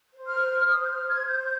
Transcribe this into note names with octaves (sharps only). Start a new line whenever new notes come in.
C5
F6
C5
C5 D#6
G6
F6
C5
G#6
C5
G6